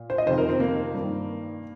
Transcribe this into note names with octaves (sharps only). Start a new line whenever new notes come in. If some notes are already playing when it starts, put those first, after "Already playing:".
Already playing: A#2
C5
D#5
F2 C3 D#3 C5
A#4
C4
A#3
G2 D#3